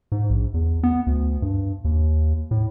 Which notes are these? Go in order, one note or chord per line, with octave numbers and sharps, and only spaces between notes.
G#2
A#1
E2
B3
D2
G2
D#2
A2